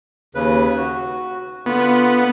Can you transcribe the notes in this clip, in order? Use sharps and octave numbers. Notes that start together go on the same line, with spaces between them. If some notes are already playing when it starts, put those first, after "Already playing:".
D#2 C#3 B4
F#4
D3 B3 F4